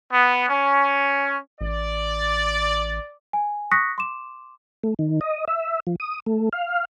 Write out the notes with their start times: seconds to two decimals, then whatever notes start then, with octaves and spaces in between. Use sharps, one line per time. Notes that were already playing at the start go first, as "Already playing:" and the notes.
0.10 B3
0.49 C#4
1.61 A1 D5
3.33 G#5
3.71 C#6 D#6 F#6 A#6 B6 C#7
3.98 C6 D6 E7
4.83 A3
4.99 D#3
5.21 D#5
5.48 E5
5.87 F3
6.00 D#6
6.26 A3
6.53 F5